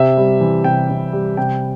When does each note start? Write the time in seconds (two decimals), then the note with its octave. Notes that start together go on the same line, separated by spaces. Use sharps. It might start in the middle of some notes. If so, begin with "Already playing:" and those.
Already playing: C3 E5
0.17 G3
0.41 E3
0.64 C3 G5
0.90 C3
1.13 G3
1.37 C3 G5